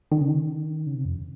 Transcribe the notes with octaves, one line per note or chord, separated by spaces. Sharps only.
D#3
C#3
D#3
C#3
C3
F2